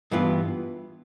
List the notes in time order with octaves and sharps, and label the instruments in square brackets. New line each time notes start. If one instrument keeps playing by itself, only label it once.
[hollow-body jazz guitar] G2 E3 B3 F4